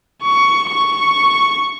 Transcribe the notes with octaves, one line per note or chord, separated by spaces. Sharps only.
C#6
C#6